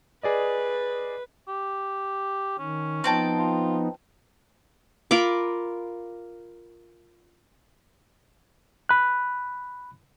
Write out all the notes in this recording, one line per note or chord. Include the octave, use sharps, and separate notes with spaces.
G#4 B4 D5 D#5
G4
D#3 C#4
F3 B3 C4 D#4 G5 A5
F4
F4 A#4 B5 D6
B5 F#6